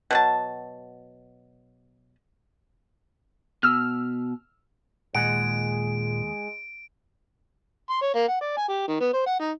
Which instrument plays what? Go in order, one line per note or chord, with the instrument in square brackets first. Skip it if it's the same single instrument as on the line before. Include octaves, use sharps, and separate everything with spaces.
[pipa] B2 F#3 A5
[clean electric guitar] B2 [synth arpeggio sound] E6 F6
[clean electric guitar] D#2 G#4 F#5 [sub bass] A#2 [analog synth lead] G#3 [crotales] D7
[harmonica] C6
C#5
A#3
F#5
D5
G#5
G4
D#3
B3
C5
F#5
D#4